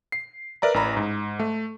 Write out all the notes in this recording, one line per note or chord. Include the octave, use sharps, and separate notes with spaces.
C7
A#4 B4 D5 E5 A#5
A1 E3 A#5 B5
G#2
A3